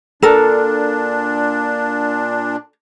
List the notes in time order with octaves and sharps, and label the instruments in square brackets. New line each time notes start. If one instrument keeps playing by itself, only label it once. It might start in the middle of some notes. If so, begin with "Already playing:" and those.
[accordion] A#2 D4 [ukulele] A4 A#4